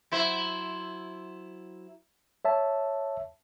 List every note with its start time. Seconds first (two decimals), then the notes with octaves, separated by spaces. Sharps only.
0.12 F#3 E4 C5
2.45 C#5 E5 A5